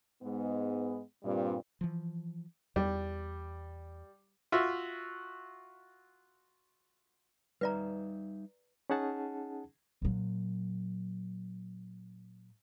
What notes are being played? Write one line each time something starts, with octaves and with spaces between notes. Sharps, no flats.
G#2 G#3 B3
G2 A#2 G3 C4 F4
E3 F3
E2 G3
F4 F#4 E5
G3 D#4 B4 D5 E5 A#5
C#4 D#4 G#4 F#5 A5
A#2 F#3